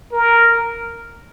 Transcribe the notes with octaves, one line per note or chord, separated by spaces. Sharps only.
A#4